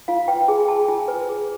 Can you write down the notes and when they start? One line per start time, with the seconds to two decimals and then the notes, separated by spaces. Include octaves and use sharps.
0.08 F4 F5
0.28 B4 G5
0.48 G#4 G#5
0.68 G#4 A5
0.88 F4 G#5
1.08 B4
1.29 G#4